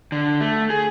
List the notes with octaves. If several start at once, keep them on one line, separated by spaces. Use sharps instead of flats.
D3
A3
G#4